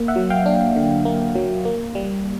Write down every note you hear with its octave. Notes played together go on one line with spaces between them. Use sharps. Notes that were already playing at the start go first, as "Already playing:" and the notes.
Already playing: A#3
E5 F#5
F#3
F5 G5
D4
D3
A#3
F#3
A#3
G3